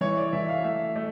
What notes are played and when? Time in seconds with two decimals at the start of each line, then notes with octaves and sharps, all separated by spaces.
0.01 E3 C#5
0.17 D5
0.33 E3 E5
0.49 F5
0.64 A3 E5
0.96 A3